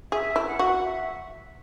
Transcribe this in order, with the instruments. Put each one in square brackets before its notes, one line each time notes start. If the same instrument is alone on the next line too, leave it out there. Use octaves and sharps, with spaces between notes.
[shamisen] G#4 [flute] E5
[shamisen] E4
[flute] F#5
[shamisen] F#4
[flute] E5